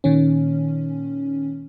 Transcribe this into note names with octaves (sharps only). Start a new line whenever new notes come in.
A#2 D#3 C#4